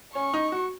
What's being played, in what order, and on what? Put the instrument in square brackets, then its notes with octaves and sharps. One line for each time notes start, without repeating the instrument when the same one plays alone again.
[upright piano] C#4 [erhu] C#6
[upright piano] D#4
F#4